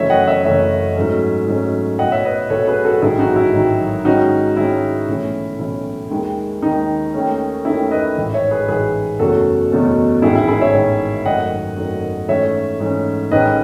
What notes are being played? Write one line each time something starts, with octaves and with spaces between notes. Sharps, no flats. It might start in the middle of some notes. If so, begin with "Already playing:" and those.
Already playing: F#1 F#2 E3 A3 C#4 C#5 E5
D#5 F#5
C#5 E5
F#1 F#2 E3 A3 C#4 C#5 E5
G#2 F#3 A3 C#4
G#2 F#3 A3 C#4
B1 A2 F#3 D#5 F#5
C#5 E5
B4 D#5
B1 A2 F#3 A4 C#5
G#4 B4
F#4 A4
A1 G#2 D#3 F#3 E4 G#4
D#4 F#4
E4
A1 G#2 D#3 F#3
G#2 D#3 G#3 C#4 D#4 F#4
G#2 D#3 G#3 C#4 E4
B1 A2 E3 A3 C#4
B1 A2 E3 A3 C#4 E4
D#2 D#3 G#3
D#2 D#3 G#3 D#4
D#2 D#3 A3 C#4
D#2 D#3 A3 C#4 E4
B4 D#5
A1 G#2 E3
C#5 E5
G#4 B4
A1 G#2 E3 G#4 B4
F#1 E2 B2 A3 C#4 F#4 A4
F#1 E2 B2 A3 C#4
A1 G#2 D#3 E4 G#4
E4
E4 G#4
C#5 E5
A1 G#2 D#3
G#1 F#2 D#3 A3 D#5 F#5
G#1 F#2 D#3 A3
G#2 E3 A3 C#4 C#5 E5
G#2 E3 A3 C#4
A1 G#2 D#3 G#3 C#4 B4 D#5